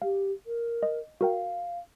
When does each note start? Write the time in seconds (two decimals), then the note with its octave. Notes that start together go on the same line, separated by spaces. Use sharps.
0.02 G4 F5
0.46 A#4
0.83 D#5
1.21 F#4 A#4 F5 G5